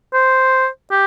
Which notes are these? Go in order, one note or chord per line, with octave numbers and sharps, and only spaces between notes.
C5
G4